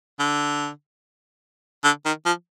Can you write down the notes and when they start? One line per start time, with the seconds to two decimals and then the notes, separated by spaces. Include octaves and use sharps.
0.19 D3
1.84 D3
2.06 D#3
2.26 F3